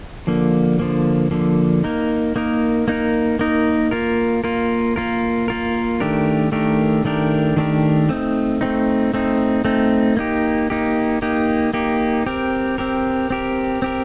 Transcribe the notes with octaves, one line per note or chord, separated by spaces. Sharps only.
D3 F3 A#3
D3 F3 A#3
D3 F3 A#3
A#3 D#4 A#4
A#3 D#4 A#4
A#3 D#4 A#4
A#3 D#4 A#4
A#3 F4 A#4
A#3 F4 A#4
A#3 F4 A#4
A#3 F4 A#4
D#3 A3 D4 G4 A#4
D#3 A3 D4 G4 A#4
D#3 A3 D4 G4 A#4
D#3 A3 D4 G4 A#4
A3 C4 D#4
A3 C4 D#4
A3 C4 D#4
A3 C4 D#4
A#3 D#4 G4
A#3 D#4 G4
A#3 D#4 G4
A#3 D#4 G4
C4 G4 A#4
C4 G4 A#4
C4 G4 A#4
C4 G4 A#4